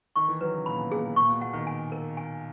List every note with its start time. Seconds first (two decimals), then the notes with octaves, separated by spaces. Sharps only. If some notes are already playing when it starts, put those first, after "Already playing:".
0.16 D#3 C#6
0.28 E3
0.41 F#3 B4
0.54 C#3
0.66 A#2 B5
0.78 B2
0.91 A#2 G#4
1.04 B2
1.16 A#2 C#6
1.29 B2
1.41 B2 F#5
1.53 D#3
1.67 G#5
1.92 A#4
2.17 G#5